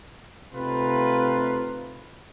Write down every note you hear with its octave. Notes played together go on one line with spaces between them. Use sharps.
C3 A3 C4 D#4 F4 B4